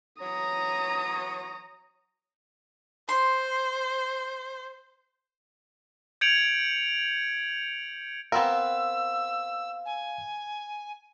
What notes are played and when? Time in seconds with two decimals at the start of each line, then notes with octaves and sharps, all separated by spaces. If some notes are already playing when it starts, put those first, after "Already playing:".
0.21 E3 F#3 C#5 A#5 D#6
3.09 C5 C6
6.21 G6 G#6 C#7 D7 F7 F#7
8.32 B3 C4 A#4 F5 E6
9.85 G#5